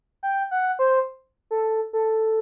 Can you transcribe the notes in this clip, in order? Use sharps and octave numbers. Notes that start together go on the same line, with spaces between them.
G5
F#5
C5
A4
A4